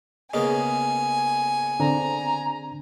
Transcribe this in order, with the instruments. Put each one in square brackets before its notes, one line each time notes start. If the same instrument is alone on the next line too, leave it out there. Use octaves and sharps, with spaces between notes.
[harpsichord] C#3 A#3 B3 [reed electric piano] D#5 [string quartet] G#5
[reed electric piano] D3 C4 D4 [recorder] A#5